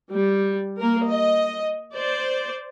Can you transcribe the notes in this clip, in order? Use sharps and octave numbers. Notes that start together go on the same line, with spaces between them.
G3
A#3 A#4
D#5
C5 D5